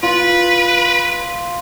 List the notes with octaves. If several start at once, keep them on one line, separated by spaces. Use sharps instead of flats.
F4 B4